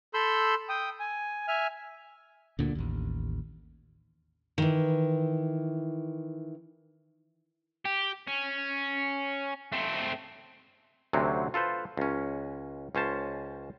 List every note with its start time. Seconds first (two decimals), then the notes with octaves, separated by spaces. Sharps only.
0.14 A4 B5 C6 E6 G6
0.69 G5 D#6
1.00 G#5
1.48 E5 G#5 F6
2.59 D2 A#2 D3
2.75 A1 D#2
4.58 D#3 E3
7.85 G4
8.27 C#4
9.72 A3 C4
11.13 D2 C3 F#3 C4 C#4
11.54 F4 A4 B4 C5
11.97 C#2 C#4
12.95 C#2 C#4 C5 A5